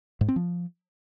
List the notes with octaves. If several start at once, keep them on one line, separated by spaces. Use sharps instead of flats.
G#2
C4
F3